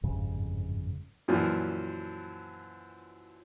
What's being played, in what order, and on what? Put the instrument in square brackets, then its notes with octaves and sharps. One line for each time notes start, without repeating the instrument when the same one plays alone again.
[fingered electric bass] G1 F2 G#2 C#3
[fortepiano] F#2 A#2 E3 F3